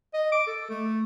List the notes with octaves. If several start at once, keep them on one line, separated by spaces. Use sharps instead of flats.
D#5
D6
A4
A3